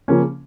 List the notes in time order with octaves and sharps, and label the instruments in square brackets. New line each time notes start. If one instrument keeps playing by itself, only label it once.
[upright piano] C#3 F3 A#3 C#4